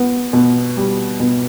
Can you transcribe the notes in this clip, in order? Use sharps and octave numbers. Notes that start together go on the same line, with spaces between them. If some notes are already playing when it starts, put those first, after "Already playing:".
Already playing: B3
B2
G3
B2